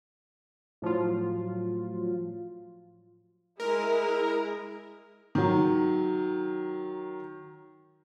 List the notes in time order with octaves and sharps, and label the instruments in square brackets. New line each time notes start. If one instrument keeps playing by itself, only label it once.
[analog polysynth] A2 F3 F#3 F4
[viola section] G#3 E4 [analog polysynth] A#4
[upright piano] D#3 F#3